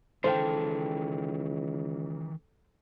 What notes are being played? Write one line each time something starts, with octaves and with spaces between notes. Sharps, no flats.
C#2 D#3 E3 A4 C5 F5 G5